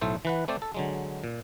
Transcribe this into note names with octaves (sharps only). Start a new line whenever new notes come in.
B1 A2 A3 A4 C5
E3 B4 F#5
A3 C4 C5 D5
A4
D3 F#3 G#3
A#2